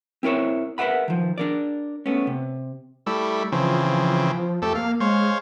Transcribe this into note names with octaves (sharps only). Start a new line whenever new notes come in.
C4 E4 A#4 C#5 E5
A#4 B4 C#5 E5 F#5 B5
D#3 F3
D4 A#4 D5
A3 B3 C#4
C3
G3 A3 E4
C#3 E3 F3 C4
F2 A3 G4 A4
A#3 F5
G#3 C5 C#5 F5